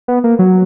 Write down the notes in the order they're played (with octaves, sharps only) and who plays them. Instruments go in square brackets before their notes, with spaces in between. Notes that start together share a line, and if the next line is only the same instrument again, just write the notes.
[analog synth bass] B3
A#3
F#3